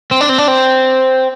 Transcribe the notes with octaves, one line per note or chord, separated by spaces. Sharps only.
C4
D4
C4
D4
C4